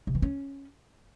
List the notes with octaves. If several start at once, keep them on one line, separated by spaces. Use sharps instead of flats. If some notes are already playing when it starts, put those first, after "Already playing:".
C3
E3
C#4